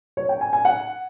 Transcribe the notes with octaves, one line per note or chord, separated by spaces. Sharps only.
C#5
G5
G#5
G#5
F#5